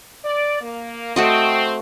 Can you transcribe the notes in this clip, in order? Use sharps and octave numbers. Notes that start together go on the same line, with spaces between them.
D5
A#3
A3 C4 F#4 D#5